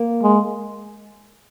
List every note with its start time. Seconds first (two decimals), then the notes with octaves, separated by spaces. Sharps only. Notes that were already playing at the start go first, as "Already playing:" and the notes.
Already playing: A#3
0.23 G#3